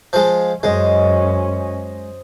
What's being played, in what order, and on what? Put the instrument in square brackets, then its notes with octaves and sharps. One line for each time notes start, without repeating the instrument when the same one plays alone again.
[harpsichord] F3 G#3
[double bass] F#2 C#4 [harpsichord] G#3 [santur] C5 D#5